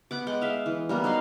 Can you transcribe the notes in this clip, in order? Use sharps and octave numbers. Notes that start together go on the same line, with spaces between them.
B3 F#5 D6
G#3 F#5 G5 D6
E5 F5
E3
G3 A#3 B3
F#3 D#4 F5 C6